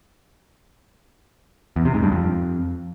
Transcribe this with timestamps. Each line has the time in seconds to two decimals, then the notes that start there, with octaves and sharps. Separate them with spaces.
1.76 E2
1.85 C3
1.94 G#2
2.03 G2
2.12 F2